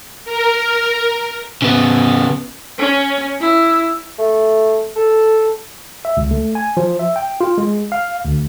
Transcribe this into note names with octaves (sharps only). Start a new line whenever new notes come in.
A#4
C#3 B3
C#4
E4
A3
A4
E5
C#2
A3
G#5
F3
E5
G5
F4
G#3
F5
D2